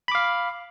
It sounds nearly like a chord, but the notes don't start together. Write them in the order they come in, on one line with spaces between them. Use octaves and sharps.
B5 D6 F5